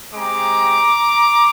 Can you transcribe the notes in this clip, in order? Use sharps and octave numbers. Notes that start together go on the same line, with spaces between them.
G#3 C4 G4 A#5 D6